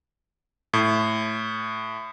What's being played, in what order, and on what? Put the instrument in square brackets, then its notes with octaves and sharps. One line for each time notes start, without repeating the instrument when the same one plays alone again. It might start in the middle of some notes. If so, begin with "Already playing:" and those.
[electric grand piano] A2